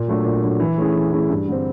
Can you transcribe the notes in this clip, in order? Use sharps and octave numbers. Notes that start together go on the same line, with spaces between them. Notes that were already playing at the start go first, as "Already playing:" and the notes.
Already playing: A#2
F#3 A3 D4
A#2
F#3 A3 D4
E3
A3 C#4 E4 G#4
E3
A3 C#4 E4 G#4
G2
D3 G3 C4